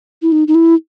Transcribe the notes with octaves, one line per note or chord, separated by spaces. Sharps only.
E4
D#4
D#4
E4